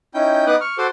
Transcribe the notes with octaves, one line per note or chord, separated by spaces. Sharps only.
C#4 D#4 E4 G5 G6
B3 D#4 B4 D6 D#6 F#6
C#6 F6
F#4 A4 C5 C6 D6